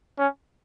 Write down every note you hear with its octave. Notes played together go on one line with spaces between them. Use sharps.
C#4